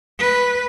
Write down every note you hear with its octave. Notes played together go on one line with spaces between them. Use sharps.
B4